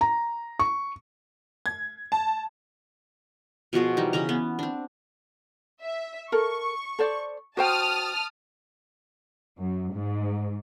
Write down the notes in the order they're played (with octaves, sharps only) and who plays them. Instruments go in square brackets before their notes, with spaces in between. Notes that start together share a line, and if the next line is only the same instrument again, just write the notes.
[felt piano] A#5
C#6
[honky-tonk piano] G#6
A5
[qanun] B2 F3 F#4 G#4
E3 G3 D#4
C#3 E3 C#4 A#5
B3
C4 D4
[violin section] E5
[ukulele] A4 A#4 [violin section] C#6
[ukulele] A4 C5 D5
[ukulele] F#4 C5 G5 [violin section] A5 D#6 F6
[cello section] F#2
G#2